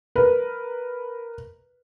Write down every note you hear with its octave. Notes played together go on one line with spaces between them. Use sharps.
A#4 B4